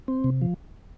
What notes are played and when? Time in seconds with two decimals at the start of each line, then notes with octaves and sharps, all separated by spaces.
0.08 C4
0.24 C3
0.41 F3